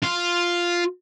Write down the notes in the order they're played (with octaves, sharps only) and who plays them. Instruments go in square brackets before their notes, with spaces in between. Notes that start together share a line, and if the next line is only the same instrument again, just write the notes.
[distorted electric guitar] F4